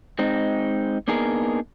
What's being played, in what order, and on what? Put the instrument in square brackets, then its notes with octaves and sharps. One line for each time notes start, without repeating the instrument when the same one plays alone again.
[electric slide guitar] G#3 C4 D#4
A#3 B3 D4 D#4 G#4 A#4